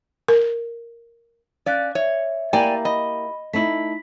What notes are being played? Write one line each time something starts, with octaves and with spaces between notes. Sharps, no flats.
A#4
C#4 D5 F5 F#6 A6
C#5 E5
A#3 E4 G4 D5 G5 G#5 A#5
D#5 B5
A3 D#4 E4 B6